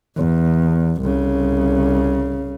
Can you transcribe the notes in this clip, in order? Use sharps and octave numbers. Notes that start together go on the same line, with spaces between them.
E2
C2 C#3